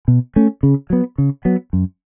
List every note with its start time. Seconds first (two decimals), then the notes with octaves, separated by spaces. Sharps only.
0.08 B2
0.36 A3 C#4
0.63 C#3
0.90 F#3 B3
1.18 C#3
1.45 F#3 B3
1.73 F#2